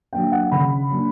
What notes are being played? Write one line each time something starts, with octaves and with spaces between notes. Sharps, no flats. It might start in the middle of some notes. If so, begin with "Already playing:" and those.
F#3 A#3 D4 G5
F#5
C#3 B5
F#3 A#3 D4